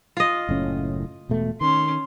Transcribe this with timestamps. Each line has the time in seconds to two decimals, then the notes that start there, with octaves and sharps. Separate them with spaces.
0.17 F4 D#5
0.49 F#1 A2 C#4
1.29 E1 B2 A3
1.61 D#3 C#4 C6